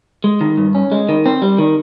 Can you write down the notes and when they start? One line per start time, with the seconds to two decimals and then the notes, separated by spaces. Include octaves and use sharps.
0.24 G#3
0.41 D#3
0.57 G2
0.75 C#4
0.92 G#3
1.09 D#3
1.26 C4
1.42 G3
1.58 D#3